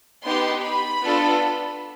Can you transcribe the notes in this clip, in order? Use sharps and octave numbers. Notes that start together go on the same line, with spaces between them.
B3 D#4 G4 C6
B5
B3 D4 F4 A4